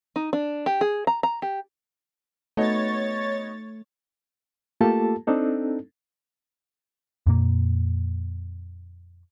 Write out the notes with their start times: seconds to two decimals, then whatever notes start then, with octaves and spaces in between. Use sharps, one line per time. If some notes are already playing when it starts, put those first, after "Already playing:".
0.16 D#4
0.33 D4
0.66 G4
0.81 G#4
1.07 A#5
1.23 A#5
1.42 G4
2.57 A3 B3 D#4 F#4 C#5 A6
4.81 A3 A#3 F4 G4 A4 A5
5.27 C4 D4 D#4 A4
7.26 F2 A#2 A#3